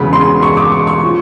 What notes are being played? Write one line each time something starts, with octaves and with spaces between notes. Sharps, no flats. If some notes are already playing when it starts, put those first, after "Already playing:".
Already playing: E1 E2 C#3 B5
C6
C#6
D6
C#6
C#6
F3